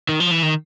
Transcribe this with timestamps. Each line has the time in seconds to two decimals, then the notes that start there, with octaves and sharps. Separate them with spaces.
0.09 D#3
0.20 F3
0.31 E3
0.43 D#3